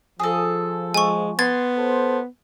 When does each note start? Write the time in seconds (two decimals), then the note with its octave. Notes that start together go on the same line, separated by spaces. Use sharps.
0.19 F3 G#4 A4
0.94 G#3 G#5 C#6
1.39 B3 C6 G#6 A6
1.78 A4 C5